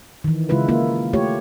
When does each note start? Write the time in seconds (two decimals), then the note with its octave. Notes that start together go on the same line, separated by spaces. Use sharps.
0.24 D#3 E3
0.49 C#3 G#3 E4 F4 B4
0.68 A#3 E4 F4
1.13 A3 F4 G4 C#5